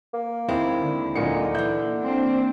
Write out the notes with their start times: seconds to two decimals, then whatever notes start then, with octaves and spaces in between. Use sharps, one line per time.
0.14 A#3
0.49 D#2 G#3 C4 E4
0.81 D3
1.15 D1 A#2 D3 D#4 C#7
1.55 E3 A#3 E4 G6
2.01 A#3 C4 D4